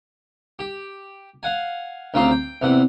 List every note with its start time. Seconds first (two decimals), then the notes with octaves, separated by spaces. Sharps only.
0.59 G4
1.43 F5 F#5 G#5
2.14 D2 C#3 A#3 C4 F4 C6
2.31 G5
2.62 E2 C3 E3 F#5